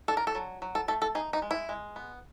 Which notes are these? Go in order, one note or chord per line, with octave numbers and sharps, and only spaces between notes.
D4 A4
A#4
A4
F#3
F#3
A4
A3 A4
A4
D#4 G#4
D#4
G#3
E4
G#3
B3